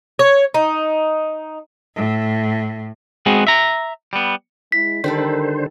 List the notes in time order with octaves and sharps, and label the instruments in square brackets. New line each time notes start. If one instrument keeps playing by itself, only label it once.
[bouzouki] C#5
D#4
[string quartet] A2
[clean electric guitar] G#3 B3 C4 F#4 G#4
E5 A#5
G3 B3
[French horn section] G#3 E4 [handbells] B6
[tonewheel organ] D3 C5 [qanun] D#3 G3 A4 [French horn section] A#4